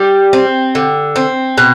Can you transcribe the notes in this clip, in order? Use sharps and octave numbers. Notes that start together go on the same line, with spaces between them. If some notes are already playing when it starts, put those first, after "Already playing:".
Already playing: G3
C4
D3
C4
B2